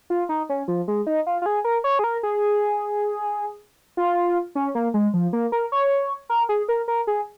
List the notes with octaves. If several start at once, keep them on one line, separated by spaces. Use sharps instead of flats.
F4
D#4
C#4
F3
G#3
D#4
F4
F4
G#4
A#4
C#5
G#4
A#4
G#4
F4
C#4
A#3
G#3
F3
A#3
A#4
C#5
A#4
G#4
A#4
A#4
G#4